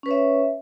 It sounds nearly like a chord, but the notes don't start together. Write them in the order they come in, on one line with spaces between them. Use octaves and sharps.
C#4 B4 C#5 E5